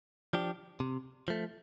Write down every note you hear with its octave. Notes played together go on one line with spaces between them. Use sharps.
F3 D4 G4
C3
F3 A3